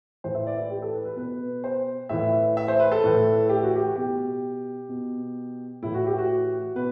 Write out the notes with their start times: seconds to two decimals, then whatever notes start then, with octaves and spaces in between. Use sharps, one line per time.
0.24 A2 E3 C5
0.35 E5
0.47 D5
0.59 E4
0.70 G4
0.82 A4
0.94 B4
1.05 B4
1.16 B2 B4
1.64 C5
2.09 A2 E3 E5
2.57 E5
2.68 C5
2.80 B4
2.92 A4
3.04 A2 E3
3.49 G4
3.63 F#4
3.76 G4
3.96 B2 G4
4.89 B2
5.83 A2 E3 E4
5.94 F#4
6.06 G4
6.18 F#4
6.75 B2 B4